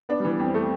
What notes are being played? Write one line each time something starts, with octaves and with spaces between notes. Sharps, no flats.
B3 D4
E3 G3
B3
F2 C4
A3